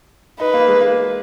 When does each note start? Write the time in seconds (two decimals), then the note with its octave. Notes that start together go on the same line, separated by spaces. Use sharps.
0.40 D#4 B4
0.54 A#3
0.68 G#3
0.81 A#3